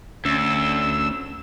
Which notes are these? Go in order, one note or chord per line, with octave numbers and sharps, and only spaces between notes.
D2 C#4 E6